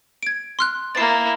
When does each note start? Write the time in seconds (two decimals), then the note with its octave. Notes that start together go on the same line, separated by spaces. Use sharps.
0.23 G#6 D7
0.59 C6 F6 F#6
0.95 A#3 E4 A6 C7